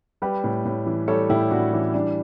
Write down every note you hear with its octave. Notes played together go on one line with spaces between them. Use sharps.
G3 G4 B4
A2
A2
E3
G3 A4 C#5
A2 E4 G4
A2 D4 F#4
E3 C#4 E4
G3 D4